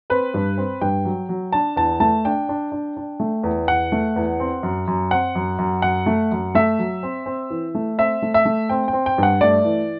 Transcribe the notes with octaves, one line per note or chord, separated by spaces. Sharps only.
C4 B4
G2
C4
G2 G5
F#3
F#3
D4 A5
E2 A5
A3 A5
D4 G5
D4
D4
D4
A3
E2
E2 F#5
A3
E2
C4
F#2
F#2
C4 F#5
F#2
F#2
F#2 F#5
A3
F#2
A3 E5
F#3
C4
C4
E3
A3
C4 E5
A3
E5
A3
C4 G5
G5
C4
G5
G2 F#5
A3 D5
E3